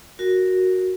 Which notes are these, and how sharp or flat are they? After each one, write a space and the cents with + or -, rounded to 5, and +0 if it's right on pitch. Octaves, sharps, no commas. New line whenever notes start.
F#4 +0 A#4 +0